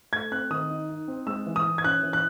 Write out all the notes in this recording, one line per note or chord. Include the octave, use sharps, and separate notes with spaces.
A3 G#6
C4 F#6
D#3 D#6
D#4
D#4
C4
G#3 E6
E3
D#6
E3
G#6
C#4 F#6
E3
F#6